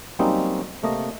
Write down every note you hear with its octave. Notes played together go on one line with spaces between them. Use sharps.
F#3 G3 A#3 C4 C#4 D#4
C3 A3 A#3 D#5